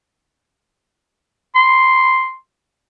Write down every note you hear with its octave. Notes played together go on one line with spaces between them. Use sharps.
C6